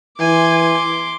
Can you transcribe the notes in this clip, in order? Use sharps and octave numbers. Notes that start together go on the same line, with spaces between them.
E3 G#5 C6 D6